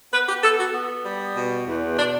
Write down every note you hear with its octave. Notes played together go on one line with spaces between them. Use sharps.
B3 B4
G4
B3 A4
F#4
B3
G3
B2
E2
B2 D4